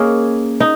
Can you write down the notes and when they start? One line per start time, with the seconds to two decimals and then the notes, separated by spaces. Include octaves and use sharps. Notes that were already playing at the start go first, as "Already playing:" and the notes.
Already playing: A#3 C#4 G#4 D#5
0.60 D#4